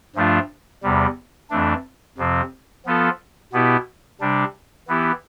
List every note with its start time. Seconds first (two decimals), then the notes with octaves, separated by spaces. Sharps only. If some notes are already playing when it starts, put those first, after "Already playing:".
0.15 G2 F3 A3 D4 F4
0.83 E2 C3 G3
1.50 F2 E3 A3 D4
2.17 F2 C3 F3 C4
2.86 F3 B3 F4 A4
3.53 B2 B3 E4 G4
4.21 C3 G3 D4
4.88 E3 B3 E4 G4